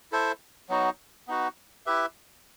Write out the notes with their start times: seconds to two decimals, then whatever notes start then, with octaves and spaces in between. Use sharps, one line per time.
0.12 E4 A4 C5 E5
0.69 F#3 B3 D#4 F#4
1.28 B3 D#4 F#4 B4
1.86 E4 G4 B4 E5